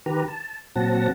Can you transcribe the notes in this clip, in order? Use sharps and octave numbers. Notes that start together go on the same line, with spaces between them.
D#3 G4 B4 A#5
A5
A#2 F#3 C4 F#5 A5 A#6